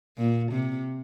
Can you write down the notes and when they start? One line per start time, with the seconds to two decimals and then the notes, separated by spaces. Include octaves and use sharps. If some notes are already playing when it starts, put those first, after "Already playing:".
0.18 A#2
0.52 C3